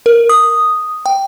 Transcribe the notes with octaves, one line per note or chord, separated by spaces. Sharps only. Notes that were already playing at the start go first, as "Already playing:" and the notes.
A#4
D#6
G5